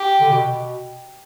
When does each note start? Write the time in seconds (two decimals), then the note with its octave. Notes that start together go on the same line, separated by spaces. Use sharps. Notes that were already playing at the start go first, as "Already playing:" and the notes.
Already playing: G4
0.20 D3
0.30 B2
0.42 B2